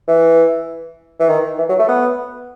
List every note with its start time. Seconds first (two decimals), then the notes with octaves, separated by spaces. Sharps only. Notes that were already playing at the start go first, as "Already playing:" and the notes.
0.08 E3
1.20 E3
1.29 D#3
1.58 E3
1.69 F#3
1.79 A3
1.89 B3